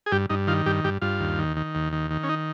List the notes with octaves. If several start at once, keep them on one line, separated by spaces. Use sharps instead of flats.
G#4
G2 G4
G2 D#4
D#3 F4
G2 G4
G2 G4
G2 F4
D#2
D#3
D#3
D#2
D#3
D#3
C#4
D#4